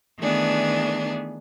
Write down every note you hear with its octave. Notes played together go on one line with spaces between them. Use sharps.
D#3 E3 A3 B3 D4 G#4